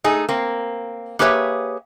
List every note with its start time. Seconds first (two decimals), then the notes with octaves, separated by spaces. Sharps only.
0.04 A3 D#4 G#4
0.29 A#3 C4
1.19 A#3 G4 G#4 B4 C#5 E5